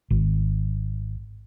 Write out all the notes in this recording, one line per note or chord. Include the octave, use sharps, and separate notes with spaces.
G#1